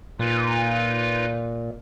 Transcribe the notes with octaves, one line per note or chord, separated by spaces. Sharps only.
A#2 D#4 F4 B4